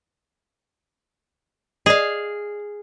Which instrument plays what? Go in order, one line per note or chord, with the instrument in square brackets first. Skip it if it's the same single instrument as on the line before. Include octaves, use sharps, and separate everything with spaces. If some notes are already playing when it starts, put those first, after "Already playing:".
[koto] G#4 F5 [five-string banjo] D5 D#5